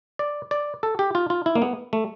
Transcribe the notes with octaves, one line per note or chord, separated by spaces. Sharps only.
D5
D5
A4
G4
F4
F4
E4
A#3
B3
A3